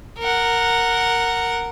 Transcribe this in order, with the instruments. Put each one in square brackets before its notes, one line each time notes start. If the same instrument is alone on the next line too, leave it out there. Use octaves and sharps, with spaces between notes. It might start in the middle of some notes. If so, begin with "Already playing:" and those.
[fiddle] A#4 F#5